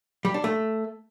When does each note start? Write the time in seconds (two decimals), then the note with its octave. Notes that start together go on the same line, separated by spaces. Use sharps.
0.25 G3
0.34 D4
0.44 A3